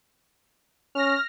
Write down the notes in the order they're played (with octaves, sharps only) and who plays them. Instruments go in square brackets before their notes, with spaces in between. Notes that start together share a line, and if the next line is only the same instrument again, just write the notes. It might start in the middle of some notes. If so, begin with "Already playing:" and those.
[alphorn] C#4 [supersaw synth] F6 A#6